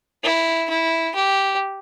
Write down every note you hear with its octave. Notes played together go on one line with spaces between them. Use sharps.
E4
E4
G4